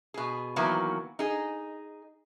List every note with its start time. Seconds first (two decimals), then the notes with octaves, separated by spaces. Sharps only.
0.14 B2 G#4
0.56 D#3 E3 F#3 A#3 B3
1.19 D#4 G#4